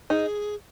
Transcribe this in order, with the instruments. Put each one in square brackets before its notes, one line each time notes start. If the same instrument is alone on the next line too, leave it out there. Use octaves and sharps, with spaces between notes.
[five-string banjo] D#4 [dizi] G#4